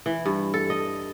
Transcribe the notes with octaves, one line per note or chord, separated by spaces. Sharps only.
E3
G2
A4
D#5